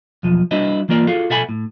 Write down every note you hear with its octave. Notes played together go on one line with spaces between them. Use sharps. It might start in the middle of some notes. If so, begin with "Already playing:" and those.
B1 E2 F3
G3 D4 E4 F#4 B4 D#5
E3 A#3 F4 A#4 D5
F4 F#4 G#4 A4 F5
B2 A4 E5 F#5 G#5 B5
A2